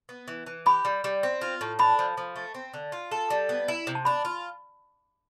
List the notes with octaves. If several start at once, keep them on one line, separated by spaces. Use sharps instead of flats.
B3
E3
E3
G4 B5
G3
G3
C4
F4
A2
D4 B5
F3
F3
A3
C4
D3
F4
A4
G3
B3
E4
C3
A5
D4 B5
F4